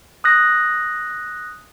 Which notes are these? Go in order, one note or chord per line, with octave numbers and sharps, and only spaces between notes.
D#6 F#6 A#6